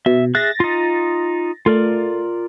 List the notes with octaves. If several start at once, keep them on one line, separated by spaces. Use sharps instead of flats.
B2 E5
G#4 E5 F#6 A6 A#6
D#4 F4
A3 F4 A#4 D5